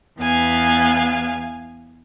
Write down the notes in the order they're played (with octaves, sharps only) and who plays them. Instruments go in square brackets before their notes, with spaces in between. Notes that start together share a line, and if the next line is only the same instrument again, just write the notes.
[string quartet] E2 B3 F5 G#5